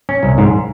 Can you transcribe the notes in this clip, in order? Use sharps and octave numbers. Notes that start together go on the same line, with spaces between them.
C#4
C2
G#2